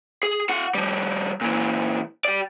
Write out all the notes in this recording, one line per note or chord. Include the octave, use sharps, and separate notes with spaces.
G#4
F4 F#5
F3 G3
A#2 E3
G4 D5